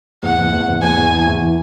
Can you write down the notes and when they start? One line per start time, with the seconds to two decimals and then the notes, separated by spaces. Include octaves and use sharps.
0.23 E2 F#5
0.38 E2
0.52 E2
0.67 E2
0.82 E2 G#5
0.97 E2
1.12 E3
1.27 E2
1.41 E3